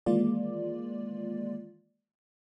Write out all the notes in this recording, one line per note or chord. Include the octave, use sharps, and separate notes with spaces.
D#3 E3 G#3 A#3 F4 D5